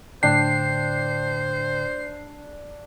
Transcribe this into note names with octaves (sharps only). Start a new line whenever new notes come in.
A2 D3 D4 C5 G5 C7